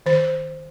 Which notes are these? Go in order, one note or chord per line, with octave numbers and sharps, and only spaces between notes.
D#3 C5